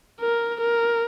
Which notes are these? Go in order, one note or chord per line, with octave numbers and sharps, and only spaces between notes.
A#4
A#4